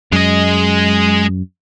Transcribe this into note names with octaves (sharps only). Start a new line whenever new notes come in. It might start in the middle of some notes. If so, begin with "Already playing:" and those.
F#2 G#3 D#5